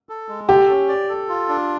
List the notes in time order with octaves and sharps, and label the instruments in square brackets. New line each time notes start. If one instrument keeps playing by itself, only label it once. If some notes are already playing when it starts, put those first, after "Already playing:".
[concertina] A4
G#3
[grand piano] G4 [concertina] A4
[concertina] C#4
D5
A4
F4
D4